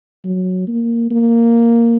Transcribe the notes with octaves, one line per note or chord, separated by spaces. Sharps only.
F#3
A#3
A#3